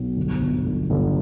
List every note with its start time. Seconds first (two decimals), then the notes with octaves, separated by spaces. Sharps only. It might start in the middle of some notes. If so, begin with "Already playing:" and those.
Already playing: B1
0.17 G1
0.41 G1
0.66 G1
0.90 G1